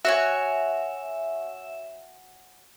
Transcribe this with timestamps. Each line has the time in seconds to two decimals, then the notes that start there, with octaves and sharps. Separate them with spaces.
0.05 F#4 C#5 E5 G#5